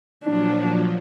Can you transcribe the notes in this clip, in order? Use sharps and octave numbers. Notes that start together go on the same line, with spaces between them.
A#2 F3 F#3 D4